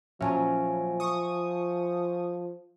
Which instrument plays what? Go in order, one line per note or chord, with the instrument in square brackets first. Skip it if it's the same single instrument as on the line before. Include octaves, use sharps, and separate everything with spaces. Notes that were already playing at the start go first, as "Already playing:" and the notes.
[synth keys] A#2 F#3 C#4 [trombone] F3 [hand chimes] E5 G#5 A5
[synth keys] C#6 D#6